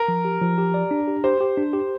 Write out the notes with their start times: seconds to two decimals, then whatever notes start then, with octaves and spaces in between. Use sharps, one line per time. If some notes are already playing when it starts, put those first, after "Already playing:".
Already playing: A#4
0.08 F3
0.25 G4
0.41 F3
0.58 G4
0.74 D5
0.91 D4
1.07 G4
1.24 G4 C5
1.41 G4
1.57 D4
1.73 G4